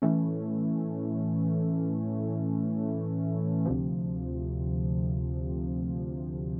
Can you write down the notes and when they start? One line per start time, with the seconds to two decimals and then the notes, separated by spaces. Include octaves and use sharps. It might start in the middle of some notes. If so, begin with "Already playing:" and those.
0.02 A2 E3 A3 C#4
3.65 D2 C3 F3